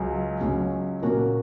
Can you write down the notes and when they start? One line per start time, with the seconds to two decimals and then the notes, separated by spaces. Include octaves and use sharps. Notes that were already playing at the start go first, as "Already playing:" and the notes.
Already playing: C#2 C#3 F#3 C#4
0.40 C#2 C#3 F#3 C#4
1.03 A#2 A#3 C#4 F#4 A#4